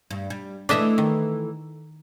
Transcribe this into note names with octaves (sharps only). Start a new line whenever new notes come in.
G2
G3
E3 A3 D4 D#5 E5
D#3